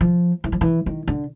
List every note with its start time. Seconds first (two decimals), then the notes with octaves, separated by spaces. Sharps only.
0.01 F3
0.44 E3
0.52 F3
0.61 E3
0.86 D#3
1.08 D3